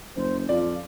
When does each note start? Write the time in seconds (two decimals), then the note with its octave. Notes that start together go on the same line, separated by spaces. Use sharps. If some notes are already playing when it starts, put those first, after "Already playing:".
0.16 F#1 C5
0.49 F2 F4 D5